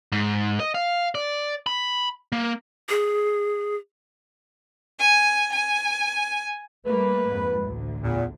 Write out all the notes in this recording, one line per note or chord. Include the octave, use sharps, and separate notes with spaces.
G#2
D#5
F5
D5
B5
A#3
G#4
G#5
G#5
G3 A3 A#3 B4
F2 G#2
A1 D2 D3
E2 A#2